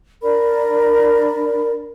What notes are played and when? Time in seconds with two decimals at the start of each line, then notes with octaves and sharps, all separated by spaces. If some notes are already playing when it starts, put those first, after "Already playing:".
0.23 D4 A#4 D5 B5